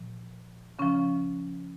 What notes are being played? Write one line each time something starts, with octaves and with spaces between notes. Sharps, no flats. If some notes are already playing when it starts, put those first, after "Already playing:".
Already playing: A#2 F3
C#3 F3 C#4